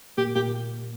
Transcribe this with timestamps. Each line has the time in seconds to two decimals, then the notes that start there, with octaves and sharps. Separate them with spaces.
0.18 A#2 A#3 G4
0.35 A#2 A#3 G4